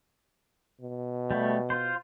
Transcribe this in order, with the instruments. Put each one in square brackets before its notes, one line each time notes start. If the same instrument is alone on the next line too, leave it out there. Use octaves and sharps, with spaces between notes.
[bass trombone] B2
[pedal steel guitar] G3 A3
F4 C5